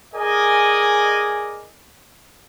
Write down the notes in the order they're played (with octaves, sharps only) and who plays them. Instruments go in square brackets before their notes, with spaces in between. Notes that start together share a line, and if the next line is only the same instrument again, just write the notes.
[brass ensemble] G#4 A#4 D5 D#5 G#5